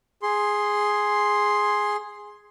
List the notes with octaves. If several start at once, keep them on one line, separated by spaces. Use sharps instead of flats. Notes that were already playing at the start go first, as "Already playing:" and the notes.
G#4 C6